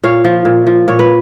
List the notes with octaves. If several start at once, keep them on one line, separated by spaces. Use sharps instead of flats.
A#2 C#5 F5
F3
A#2
F3
A#2 C#5
B4